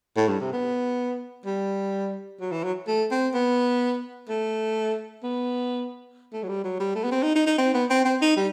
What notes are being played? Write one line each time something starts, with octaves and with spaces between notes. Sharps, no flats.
A2
G2
C3
B3
G3
F#3
E3
F#3
A3
C4
B3
A3
B3
A3
F#3
G3
F#3
G3
A3
B3
C4
D#4
D#4
D#4
C4
B3
C4
C4
D#4
G3